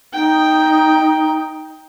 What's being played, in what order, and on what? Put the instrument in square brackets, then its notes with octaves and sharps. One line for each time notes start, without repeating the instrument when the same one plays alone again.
[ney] D#4 [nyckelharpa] G5